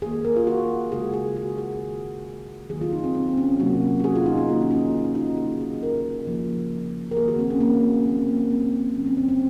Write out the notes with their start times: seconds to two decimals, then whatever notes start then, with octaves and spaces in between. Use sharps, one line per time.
0.02 D#3 G#4
0.06 A#3
0.25 A#4
0.36 F4
0.47 F#4
0.91 C#3 G#3 G#4
1.13 G#4
1.36 F#4
1.58 G#4
1.81 D#3 G#3
2.70 D#3 F#3 A#3 G#4
2.81 F4
2.93 D#4
3.04 C4
3.15 C4
3.37 C#4
3.59 C3 F#3 A#3 F#4
4.00 F#4
4.04 G#4
4.16 F4
4.26 D#4
4.37 D#4
4.49 D#3 A#3 F4
4.62 C#4
4.71 D#4
4.93 F4
5.04 F#4
5.15 D#4
5.27 F4
5.38 C#3 F#3 A#3 G#4
5.60 G#4
5.83 A#4
6.27 C#3 F3 A#3
7.11 A#4
7.17 D#3 A#3 G#4
7.28 F#4
7.39 C4
7.50 C#4
7.61 A#3
8.05 C#3 F#3 A#3 C4
8.28 A#3
8.51 C4
8.95 C#3 F#3 A#3 C#4
9.06 C4
9.17 C4
9.28 C4